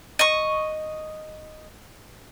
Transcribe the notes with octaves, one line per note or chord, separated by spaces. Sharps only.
D#5 C#6